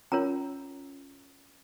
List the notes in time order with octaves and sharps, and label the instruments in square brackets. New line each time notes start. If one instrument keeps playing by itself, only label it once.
[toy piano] C#4 F4 A#4 C#5 A#5